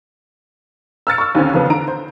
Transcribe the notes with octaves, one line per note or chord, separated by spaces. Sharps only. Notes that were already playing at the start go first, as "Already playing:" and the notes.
E6 F6 A6 C#7
C#6 E6
D#2 D3 C4 C#4
F2 C#3 F3 B3
D3 A#5 D7
C5